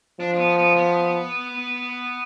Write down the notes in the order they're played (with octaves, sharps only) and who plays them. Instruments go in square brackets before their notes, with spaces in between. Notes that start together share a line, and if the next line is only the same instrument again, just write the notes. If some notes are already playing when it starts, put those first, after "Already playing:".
[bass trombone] F3 [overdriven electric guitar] D4
[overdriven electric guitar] D4
B3
B3
B3